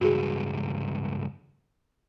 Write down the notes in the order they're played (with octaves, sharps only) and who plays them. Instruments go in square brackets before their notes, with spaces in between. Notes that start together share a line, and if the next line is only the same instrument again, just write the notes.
[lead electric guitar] C#2 G2 [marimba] F#4 G#4